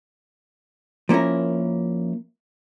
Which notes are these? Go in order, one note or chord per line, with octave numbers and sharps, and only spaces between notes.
F3 A#3 C#4 E4 A#4